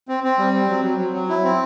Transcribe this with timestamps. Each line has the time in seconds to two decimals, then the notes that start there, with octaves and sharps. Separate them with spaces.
0.09 C4
0.24 C4
0.39 G3
0.53 C4
0.68 F#3
0.84 F#3
0.99 F#3
1.14 F#3
1.29 E4
1.44 C4